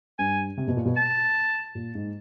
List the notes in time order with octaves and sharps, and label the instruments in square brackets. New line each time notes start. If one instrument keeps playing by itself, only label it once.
[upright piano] G2 [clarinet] G#5
[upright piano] C3
B2
A#2
B2
[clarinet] A5
[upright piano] A#2
G#2